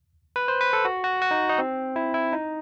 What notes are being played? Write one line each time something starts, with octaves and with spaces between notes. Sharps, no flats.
B4
C5
B4
A4
F#4
F#4
F#4
D#4
D#4
C4
E4
E4
D#4